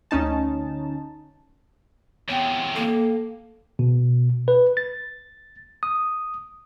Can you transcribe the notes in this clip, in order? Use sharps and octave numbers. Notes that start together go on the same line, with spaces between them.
D2 C#4 D#4 A5
E2 C3 B3 C#5 G5
A#3 A4
B2
B4
A6
D#6